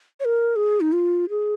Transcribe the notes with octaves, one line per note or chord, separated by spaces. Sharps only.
C#5
A#4
G#4
D#4
F4
G#4